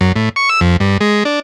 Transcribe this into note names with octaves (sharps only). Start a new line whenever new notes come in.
F#2
A2
C#6
E6
F2
G2
G#3
D4